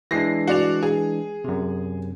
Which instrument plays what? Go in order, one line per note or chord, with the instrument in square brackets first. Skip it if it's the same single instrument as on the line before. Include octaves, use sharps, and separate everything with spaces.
[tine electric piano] E3 G#3 D4 [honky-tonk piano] A#6 C7
[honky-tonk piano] F#4 D5 F7
G#4
[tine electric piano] F#2 C3